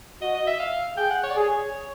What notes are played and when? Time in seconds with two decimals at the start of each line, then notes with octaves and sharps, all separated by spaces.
0.21 F#4 D#5
0.35 D#5
0.47 E5
0.60 F5
0.97 G#4 G5
1.11 F#5
1.23 C#5
1.30 D5
1.36 G#4 C#5